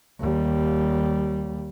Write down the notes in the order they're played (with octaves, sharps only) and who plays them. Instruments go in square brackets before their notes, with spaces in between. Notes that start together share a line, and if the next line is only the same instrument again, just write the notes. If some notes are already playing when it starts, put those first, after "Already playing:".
[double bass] D#2 G3